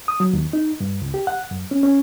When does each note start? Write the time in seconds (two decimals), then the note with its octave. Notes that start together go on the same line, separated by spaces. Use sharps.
0.08 D#6
0.20 F#3
0.33 D#2
0.53 D#4
0.80 G2
1.02 C#2
1.14 G4
1.27 F#5
1.51 F#2
1.71 C#4
1.83 C#4